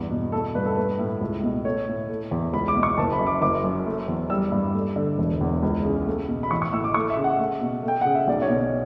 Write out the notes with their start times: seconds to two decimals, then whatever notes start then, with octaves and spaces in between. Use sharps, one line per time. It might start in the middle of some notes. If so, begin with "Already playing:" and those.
Already playing: E2 G2
0.10 B2
0.32 A3 A4
0.55 G2 B4
0.66 A4
0.77 A3 B4
0.99 A2
1.21 C#2
1.43 B2
1.65 A3 C#5
1.87 A2
2.09 A3
2.31 E2
2.53 C#2 B5
2.68 D6
2.76 B2
2.83 C#6
2.98 F#1 A5
3.12 B5
3.20 F#2
3.27 D6
3.41 F#1 D6
3.64 F#2
3.86 A3
4.08 E2
4.30 G3 E6
4.52 G2
4.74 A3
4.96 D3
5.18 E1
5.41 E2
5.63 C#2
5.84 C#3
6.07 A3
6.28 B2
6.43 B5
6.51 A1 C#6
6.62 C#6
6.73 A2 E6
6.84 D6
6.94 A3 C#6
7.10 E5
7.17 C#3
7.24 F#5
7.39 A3
7.61 B2
7.83 A3
7.88 G5
8.01 C#3 F#5
8.15 E5
8.28 B1 D5
8.42 C#5
8.49 B2
8.57 C#5